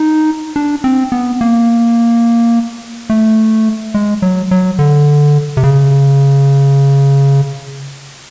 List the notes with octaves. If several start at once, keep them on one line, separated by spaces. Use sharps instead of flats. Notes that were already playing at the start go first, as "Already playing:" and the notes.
Already playing: D#4
D4
C4
B3
A#3
A3
G#3
F#3
F#3
D3
C3
C#3